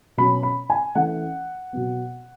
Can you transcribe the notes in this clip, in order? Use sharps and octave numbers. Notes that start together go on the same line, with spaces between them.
B2 F#3 C#4 B5
B5
G#5
E3 A3 C#4 F#5
B2 F#3 B3